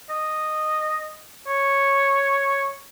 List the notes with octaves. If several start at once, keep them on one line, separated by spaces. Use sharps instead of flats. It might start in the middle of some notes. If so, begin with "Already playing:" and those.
D#5
C#5